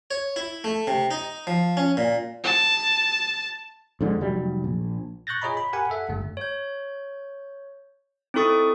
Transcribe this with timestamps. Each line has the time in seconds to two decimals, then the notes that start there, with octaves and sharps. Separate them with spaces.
0.11 C#5
0.36 E4
0.64 A3
0.87 C3
1.11 D#4
1.47 F3
1.77 C#4
1.97 A#2
2.44 A5
4.01 F2 G#2 D3
4.21 F1 F#3 G3
4.64 A#1
5.27 C#6 F#6 G6 A6 A#6
5.42 F4 G#4 C#5 D#5 A#5 B5
5.57 B5
5.73 G4 A#4 F#5 G#5 B5
5.90 A4 E5 F#5
6.09 G1 G2 A3
6.37 C#5 G6
8.34 C4 D#4 E4 A4 C#6 D#6